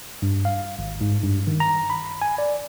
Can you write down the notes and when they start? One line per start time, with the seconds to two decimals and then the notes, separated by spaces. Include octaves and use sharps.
0.22 G2
0.45 F5
0.79 G#1
1.01 G#2
1.24 G2
1.47 D#3
1.60 A#5
1.90 B5
2.21 G#5
2.38 D5